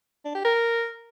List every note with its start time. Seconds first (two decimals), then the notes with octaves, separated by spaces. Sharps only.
0.25 D4
0.35 G4
0.45 A#4